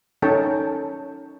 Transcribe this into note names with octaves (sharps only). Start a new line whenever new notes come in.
C#4 D#4 A4 C#5 G5 A5